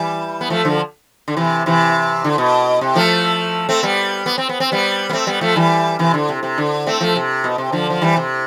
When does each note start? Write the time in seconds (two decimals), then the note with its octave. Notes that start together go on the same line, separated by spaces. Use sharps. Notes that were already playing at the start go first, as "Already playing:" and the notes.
Already playing: E3 G3
0.41 B3
0.50 F3 A3
0.65 D3 F3
1.28 D3
1.37 C3 E3
1.66 C3 E3
2.24 D3
2.38 B2
2.81 C3
2.96 F3 A3
3.69 A3 C4
3.83 G3 B3
4.26 B3
4.38 C4
4.49 B3
4.60 C4
4.72 G3 B3
5.09 B3
5.13 A3 C4
5.27 G3 B3
5.41 F3 A3
5.56 E3 G3
5.99 C3 E3
6.14 D3
6.29 C3
6.43 C3
6.58 D3
6.86 A3 C4
7.01 F3 A3
7.16 C3
7.44 B2
7.58 C3
7.72 D3 F3
7.90 F3
8.02 E3 G3
8.17 C3